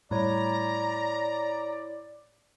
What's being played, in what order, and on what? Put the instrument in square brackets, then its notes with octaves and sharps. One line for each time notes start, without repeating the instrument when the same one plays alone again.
[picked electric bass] A2 G3 [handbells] E4 C#5 [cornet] D5 [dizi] A#5